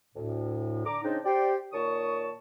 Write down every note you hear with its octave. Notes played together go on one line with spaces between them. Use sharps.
D2 A2
D3 A#5 D6
C#3 G#3 C4 D4 D#4
G4 C5 D5
A#2 D#3 C#5 A5 C#6 D#6